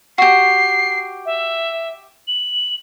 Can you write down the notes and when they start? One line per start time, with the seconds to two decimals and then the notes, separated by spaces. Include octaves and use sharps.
0.18 F#4 G4 C7
1.26 E5
2.28 F#7